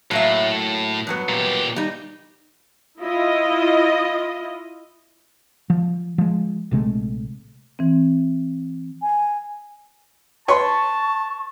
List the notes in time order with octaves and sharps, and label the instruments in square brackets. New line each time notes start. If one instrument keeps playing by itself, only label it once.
[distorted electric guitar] A2 [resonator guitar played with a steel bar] F#3 A#3 E5
[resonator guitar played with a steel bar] G2 F#3 B3
[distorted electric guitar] A#2 G4
[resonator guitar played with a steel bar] G3 D#4
[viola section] E4 F4 D#5
[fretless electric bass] F3
F3 G#3
A#1 C3 G#3 A3
[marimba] E3 C4
[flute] G#5
[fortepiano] B4 C#5 C6 [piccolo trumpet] A5 [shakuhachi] C#6